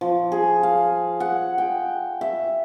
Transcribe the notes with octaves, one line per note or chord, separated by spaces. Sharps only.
F3
G#4
F5
F#5
G5
E5